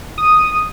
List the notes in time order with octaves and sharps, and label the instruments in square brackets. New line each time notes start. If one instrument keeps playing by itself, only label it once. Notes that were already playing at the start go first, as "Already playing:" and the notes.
[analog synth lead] D#6